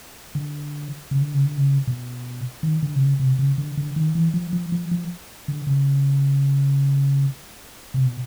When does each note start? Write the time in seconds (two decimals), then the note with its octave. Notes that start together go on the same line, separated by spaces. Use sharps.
0.35 D3
1.11 C#3
1.22 D3
1.34 C#3
1.45 D3
1.57 C#3
1.87 B2
2.63 D#3
2.83 D3
2.96 C3
3.01 C#3
3.20 C3
3.39 C#3
3.58 D3
3.77 D3
3.96 D#3
4.15 E3
4.34 F3
4.53 F3
4.72 F3
4.91 F3
5.48 D3
5.67 C#3
7.94 C3
8.06 B2